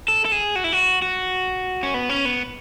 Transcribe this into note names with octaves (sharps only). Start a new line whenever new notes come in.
A4
A4
G#4
F#4
E4
F#4
F#4
C#4
B3
C#4
B3